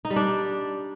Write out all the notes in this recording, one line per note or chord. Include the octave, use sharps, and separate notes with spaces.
D#4
G3
D4